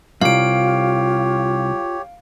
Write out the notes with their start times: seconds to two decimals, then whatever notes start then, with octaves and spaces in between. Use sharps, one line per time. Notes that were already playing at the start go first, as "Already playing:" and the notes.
0.21 C2 F#2 F4 G4 C#5 F5 D7